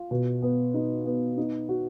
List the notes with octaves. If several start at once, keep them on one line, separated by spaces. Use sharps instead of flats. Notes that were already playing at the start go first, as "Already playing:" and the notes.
Already playing: F4
B2
B3
D#4
B3
D#4
F#4